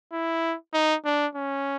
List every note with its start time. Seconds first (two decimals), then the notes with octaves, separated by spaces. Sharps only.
0.12 E4
0.74 D#4
1.05 D4
1.36 C#4